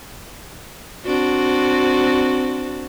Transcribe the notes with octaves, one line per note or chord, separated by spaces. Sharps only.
C4 D4 F#4